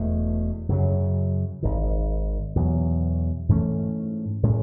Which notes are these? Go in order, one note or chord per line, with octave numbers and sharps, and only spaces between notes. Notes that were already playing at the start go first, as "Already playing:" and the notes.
Already playing: E1 E2 B2 A3
F#2 C#3 F#3
G#1 G#2 D#3
E2 B2 F#3
G#2 E3 A3 C#4
A2 G#3 C#4